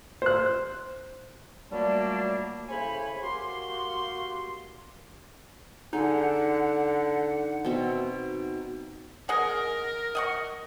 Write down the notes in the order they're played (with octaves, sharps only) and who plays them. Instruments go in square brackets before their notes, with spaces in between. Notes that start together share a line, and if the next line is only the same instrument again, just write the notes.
[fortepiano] C5 F#6
[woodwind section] A#2 F#3 G3 A3 A#3 D4
A2 C#3 C5 C#5 G#5 B5
A#3 F#4 G4 C6
[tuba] D3 [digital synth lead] D#4 [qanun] G#4 [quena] F#5
[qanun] B2 C4 E5
[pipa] G#4 D#5 F#5 [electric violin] A#4
[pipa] D#5 F#5 C#6